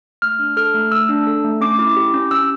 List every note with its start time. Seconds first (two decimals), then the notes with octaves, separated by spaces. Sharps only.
0.22 A3 F6
0.39 D4
0.57 A4 F6
0.74 A3
0.92 A3 E6
1.09 D4
1.27 A4
1.44 A3
1.61 C#4 D6
1.79 E4
1.96 G4
2.14 C#4
2.31 C#4 E6